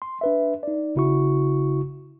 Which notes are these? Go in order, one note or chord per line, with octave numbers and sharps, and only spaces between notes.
C6
D4 B4 E5
D#4 D5
G#1 C#3 E4 F#4 C#6